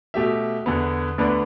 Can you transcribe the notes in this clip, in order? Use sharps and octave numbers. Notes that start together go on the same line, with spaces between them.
B2 A3 G4 E5
E2 D3 B3
D2 D3 B3 D4 B4